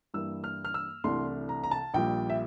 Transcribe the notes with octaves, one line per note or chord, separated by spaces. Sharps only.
G2 E3 G3 A#3 E6
F6
F6
E6
C2 C3 E3 A3 D4 C6
A#5
A#5
A5
A#1 A#2 G3 G5
E5